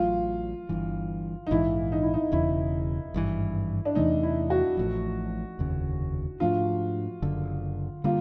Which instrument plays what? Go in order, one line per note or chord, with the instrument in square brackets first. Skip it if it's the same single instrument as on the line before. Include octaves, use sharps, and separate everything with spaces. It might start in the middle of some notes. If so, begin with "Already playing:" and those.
Already playing: [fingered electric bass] A1 A2 F#3 [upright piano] F4
[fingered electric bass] G1 G2 E3
[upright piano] D#4
[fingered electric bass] A#1 G#2 E3 [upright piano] E4
[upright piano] D#4
E4
D#4
[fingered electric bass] E1 E2 C#3 [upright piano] E4
[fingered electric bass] G#1 G2 E3
[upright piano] D4
[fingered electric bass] E2 C3 E3 A3 [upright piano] D#4
[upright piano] E4
F#4
[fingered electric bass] A1 A2 F3
F1 D#2 C#3
[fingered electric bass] G#2 F3 A3 D4 [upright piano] F4
[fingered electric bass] F#1 F#2 D3
[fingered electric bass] D3 G3 A#3 [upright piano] F4